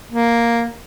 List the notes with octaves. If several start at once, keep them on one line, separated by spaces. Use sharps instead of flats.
A#3